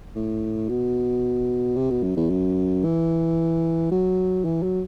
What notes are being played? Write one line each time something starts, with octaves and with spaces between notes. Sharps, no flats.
A2
B2
C3
B2
F#2
E2
F#2
E3
F#3
E3
F#3